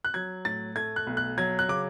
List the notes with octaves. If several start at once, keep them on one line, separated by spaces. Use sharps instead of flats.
F#6
F#3 G#6
A2 A6
A3 G#6
F#6
B1
F#6
F#3 G#6
F#6
C#3 D6